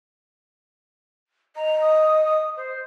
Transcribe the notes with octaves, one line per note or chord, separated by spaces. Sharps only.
D#5 A#5
D#6
D#6
C5